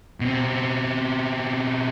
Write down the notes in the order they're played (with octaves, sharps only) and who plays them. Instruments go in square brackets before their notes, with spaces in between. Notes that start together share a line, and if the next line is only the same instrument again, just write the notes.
[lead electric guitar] B2 C4